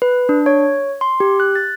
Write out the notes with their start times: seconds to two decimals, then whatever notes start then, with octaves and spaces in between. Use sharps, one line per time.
0.02 B4
0.29 D4
0.46 C#5
1.01 C6
1.20 G4
1.40 F#6
1.56 A6